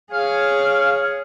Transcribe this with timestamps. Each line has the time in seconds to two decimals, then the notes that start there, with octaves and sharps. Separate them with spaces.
0.12 G#4 C#5 F5